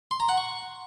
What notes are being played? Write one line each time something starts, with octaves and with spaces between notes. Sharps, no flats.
C6
A#5
F#5
C#6